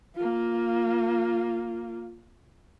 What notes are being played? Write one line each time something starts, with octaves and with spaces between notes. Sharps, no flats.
A#3 F4